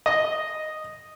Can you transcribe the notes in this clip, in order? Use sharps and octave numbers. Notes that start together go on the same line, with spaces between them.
D#5